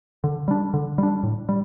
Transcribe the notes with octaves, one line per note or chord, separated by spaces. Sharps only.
D3
G3 D4
D3
G3 D4
A2
G3